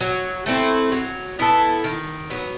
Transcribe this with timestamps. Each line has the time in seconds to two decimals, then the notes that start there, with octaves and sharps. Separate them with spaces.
0.01 F#3
0.46 A3 C4 E4
0.92 F#3
1.39 B3 E4 A4
1.84 D#3
2.30 F#3 B3